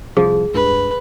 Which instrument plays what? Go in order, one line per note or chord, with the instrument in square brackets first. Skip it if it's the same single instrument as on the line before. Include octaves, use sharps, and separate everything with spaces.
[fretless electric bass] C2 C3 F3 [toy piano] G#4
[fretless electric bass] C#2 G2 [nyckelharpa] B4